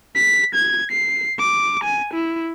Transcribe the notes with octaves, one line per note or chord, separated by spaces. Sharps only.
B6
G#6
C7
D6
G#5
E4